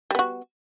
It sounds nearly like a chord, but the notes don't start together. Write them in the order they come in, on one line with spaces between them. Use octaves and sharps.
G3 B3 F#4